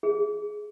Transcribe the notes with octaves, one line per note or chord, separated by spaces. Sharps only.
G#4